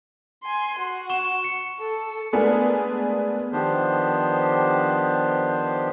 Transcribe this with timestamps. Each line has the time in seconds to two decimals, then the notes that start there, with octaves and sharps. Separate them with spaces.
0.43 G#5 C6
0.79 F#4
1.10 C#6 E7
1.44 C#7
1.80 A4
2.33 G#3 A3 B3 D4 G#4 A#4
3.53 D#3 F3 B3 D4 G4 C5